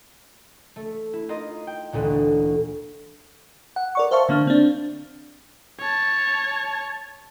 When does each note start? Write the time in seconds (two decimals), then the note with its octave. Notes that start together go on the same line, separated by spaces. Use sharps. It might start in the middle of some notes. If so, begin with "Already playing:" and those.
0.76 A3
1.13 E4
1.29 D#4 F4 A#4 D#5
1.67 G5
1.92 A1 D2 A#2 D3
3.76 F#5
3.95 A#4 D5 C#6
4.11 C5 E5 F5 A5 C#6
4.29 D3 A#3 D4 F6
4.47 C4 D4
5.80 C#5 A5